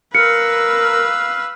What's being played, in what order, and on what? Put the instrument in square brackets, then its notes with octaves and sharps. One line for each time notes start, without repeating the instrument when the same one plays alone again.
[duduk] A#4 [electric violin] B4 E6 [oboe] F5 [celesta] C#7